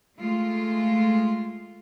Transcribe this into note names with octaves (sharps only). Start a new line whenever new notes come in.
G#3 A3 F4